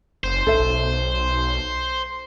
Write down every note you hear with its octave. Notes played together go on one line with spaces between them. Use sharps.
F#1 C5
B1 A4 E5